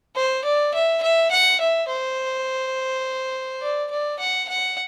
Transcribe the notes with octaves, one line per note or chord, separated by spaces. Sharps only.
C5
D5
E5
E5
F#5
E5
C5
D5
D5
F#5
F#5